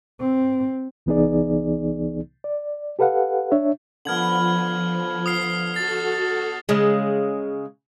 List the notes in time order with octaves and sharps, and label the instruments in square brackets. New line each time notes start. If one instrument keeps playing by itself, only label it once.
[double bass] C4
[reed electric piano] C2 E3 B3 D#4 G#4 D5
D5
G4 A4 B4 F5 F#5
D4 C#5 E5
[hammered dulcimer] D3 B3 [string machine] F3 [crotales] F6 G#6 F#7
[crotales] D#6 F6 C7
[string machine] F#4 A4 [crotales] A6 C7
[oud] C#3 G#3